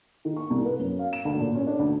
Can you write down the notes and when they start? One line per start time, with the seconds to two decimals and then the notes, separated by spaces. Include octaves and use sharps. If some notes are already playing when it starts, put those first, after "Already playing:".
0.25 D#3
0.37 C#6
0.50 C2
0.65 B4
0.79 F#2
0.99 F5
1.13 E7
1.25 D2
1.40 A#2
1.55 C#4
1.67 D4
1.79 D2